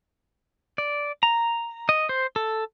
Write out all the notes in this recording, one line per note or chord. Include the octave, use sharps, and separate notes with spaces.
D5
A#5
D#5
C5
A4